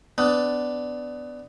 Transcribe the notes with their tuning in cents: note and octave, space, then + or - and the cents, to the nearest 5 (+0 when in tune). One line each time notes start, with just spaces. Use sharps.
B3 +25 D4 +0